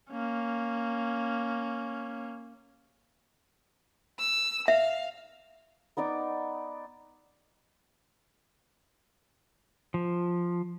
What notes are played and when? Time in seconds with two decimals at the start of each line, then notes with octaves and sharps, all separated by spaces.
0.11 A#3 C#4
4.19 E6
4.68 E5 F5
5.97 B3 D#4 D5 D6
9.94 F3